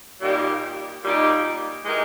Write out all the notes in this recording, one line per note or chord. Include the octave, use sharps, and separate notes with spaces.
A#2 G3 A#3 D#4 G4
A#2 G3 A#3 D#4 G4
E3 G#3 D#4 G4 A#4